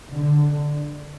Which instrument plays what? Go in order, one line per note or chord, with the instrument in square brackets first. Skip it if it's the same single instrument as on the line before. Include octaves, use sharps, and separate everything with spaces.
[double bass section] D3